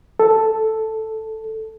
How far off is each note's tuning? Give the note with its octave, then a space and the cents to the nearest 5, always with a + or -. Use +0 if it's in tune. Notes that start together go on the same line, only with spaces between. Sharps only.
A4 +0